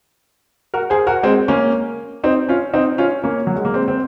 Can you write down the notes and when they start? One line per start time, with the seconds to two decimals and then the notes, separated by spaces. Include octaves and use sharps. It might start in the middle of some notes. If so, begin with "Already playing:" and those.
0.74 F#4 A#4
0.90 G#4 C5
1.07 F#4 A#4
1.23 G#3 C4
1.48 A#3 C#4
2.24 C4 D#4
2.49 C#4 F4
2.73 C4 D#4
2.98 C#4 F4
3.24 A#3 C#4
3.47 F#3
3.56 G#3
3.65 A#3
3.74 G#3 C4
3.88 C4